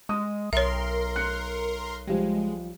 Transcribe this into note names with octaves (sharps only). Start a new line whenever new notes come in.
G#3 D#6
B1 A#4 C#5 E5 C6
F#6 C#7
F3 G3 G#3